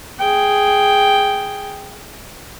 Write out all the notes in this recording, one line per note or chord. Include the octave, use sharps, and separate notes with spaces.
G#4 G5